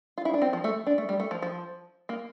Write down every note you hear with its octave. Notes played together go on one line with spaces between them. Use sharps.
F4
E4
D4
C4
F3
A3
D4
A3
G3
A3
F3
F3
A#3